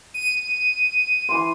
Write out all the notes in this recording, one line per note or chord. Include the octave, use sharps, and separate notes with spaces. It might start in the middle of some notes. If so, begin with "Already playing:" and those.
D#7
E3 C6